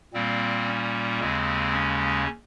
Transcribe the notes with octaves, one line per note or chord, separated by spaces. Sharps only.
A#2 G3 A#3 C4
C#4
D#2 C#3 G#3 C4
C#4